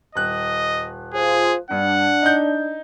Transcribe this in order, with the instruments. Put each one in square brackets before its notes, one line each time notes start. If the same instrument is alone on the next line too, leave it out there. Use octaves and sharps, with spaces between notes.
[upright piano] D#1 F#6 [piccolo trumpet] D#5
[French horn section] F4 C5 [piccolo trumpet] G#4
[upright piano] G2 [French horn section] D4 [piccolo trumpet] F#5
[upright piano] D#4 G6